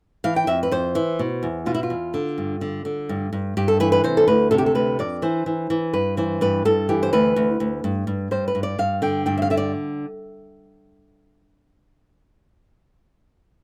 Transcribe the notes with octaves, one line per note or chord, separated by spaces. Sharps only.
E3 F5
G5
F2 E5
B4
F2 C5
E3
B2
E2
B2 F4
E4
F4
E2
D3
G2
D3
D3
G2
G2
G2 G4
A4
E3 B4
B4
C3 C5
A4
D2 B4
C3 A4
G4
A4
D2 B4
F2 D5
E3 C5
E3
E3
G2 B4
E3 C5
G2 B4
G2 A4
E3 G4
C5
D2 B4
D2
D2
G2
G2
G2 C5
B4
G2
D5
G2 F5
D3 G5
G2 G5
E5
F5
D3 E5
D5